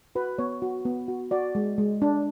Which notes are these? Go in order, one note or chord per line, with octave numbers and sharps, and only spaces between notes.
F#4 B4
B3 C#5
F#4
B3
F#4
F#4 D5
G#3
G#3
D4